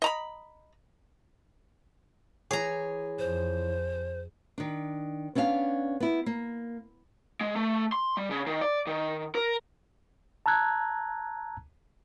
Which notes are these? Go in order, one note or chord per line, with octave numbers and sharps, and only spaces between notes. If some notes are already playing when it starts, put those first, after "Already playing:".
D#5 A#5 B5
E3 G#4 C#5 A#5
F2 C5
D#3 D4
B3 C#4 D4 E5 F5
B3 E4
A#3
G#3
A3
C6
G3
C#3
D#3
D5
D#3
A#4
A5 A#5 E6 F#6 G#6